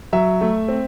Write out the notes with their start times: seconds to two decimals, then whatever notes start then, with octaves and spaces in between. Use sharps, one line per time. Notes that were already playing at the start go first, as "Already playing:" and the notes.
0.13 F#3 E5
0.41 A3
0.68 C4